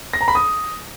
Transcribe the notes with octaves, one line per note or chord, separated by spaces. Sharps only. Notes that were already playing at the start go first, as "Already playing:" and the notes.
A#6
A#5
B5
D#6